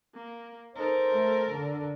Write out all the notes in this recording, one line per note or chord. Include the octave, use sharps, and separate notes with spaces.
A#3
D#4 A4 A#4 C5
A3
D3